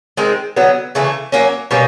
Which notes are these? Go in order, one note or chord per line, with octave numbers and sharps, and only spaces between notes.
D#3 G#3 C4
D3 F#3 B3
C#3 E3 A3
F#3 A#3 C#4
B2 G3 A#3 C#4